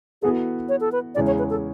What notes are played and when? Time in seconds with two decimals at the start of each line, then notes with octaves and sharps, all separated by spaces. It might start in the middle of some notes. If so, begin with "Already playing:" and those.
0.22 E3 B3 F#4 G#4 A4
0.69 C#5
0.81 A4
0.92 B4
1.15 E2 C#3 G#3 C#4 E4 D5
1.27 C#5
1.39 B4
1.50 A4